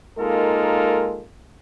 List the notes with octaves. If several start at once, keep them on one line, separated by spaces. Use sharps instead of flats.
G#3 A#3 D#4 F4 A4 A#4